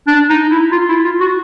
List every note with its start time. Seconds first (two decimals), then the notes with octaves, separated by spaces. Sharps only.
0.08 D4
0.30 D#4
0.51 E4
0.72 F4
0.89 E4
1.05 F4
1.21 F#4